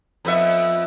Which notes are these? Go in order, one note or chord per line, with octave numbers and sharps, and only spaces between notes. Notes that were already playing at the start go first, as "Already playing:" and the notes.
F2 B3 E5